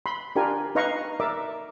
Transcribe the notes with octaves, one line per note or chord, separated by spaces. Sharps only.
B5 C6
D4 F4 G4 A#4 G#5
D#4 B4 D#5 F5 A#5 C#6
A#4 D5 E5 D6